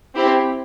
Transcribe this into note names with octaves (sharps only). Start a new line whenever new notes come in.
C4 E4 G4